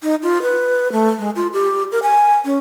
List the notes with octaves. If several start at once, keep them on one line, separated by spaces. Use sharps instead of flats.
D#4
F4
B4
A3
G#3
F4
G4
A#4
G#5
C#4